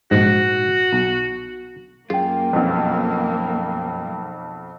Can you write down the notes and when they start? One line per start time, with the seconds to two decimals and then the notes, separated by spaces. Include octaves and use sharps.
0.11 A#1 G#2 F#4
0.93 B1
2.10 F#2 A#3 F4 G#4 G5
2.53 B1 F2